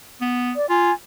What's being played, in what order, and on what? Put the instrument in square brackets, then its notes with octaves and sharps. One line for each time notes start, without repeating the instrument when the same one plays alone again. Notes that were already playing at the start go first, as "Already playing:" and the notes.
[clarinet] B3
[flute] D5
[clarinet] F4 [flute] G#5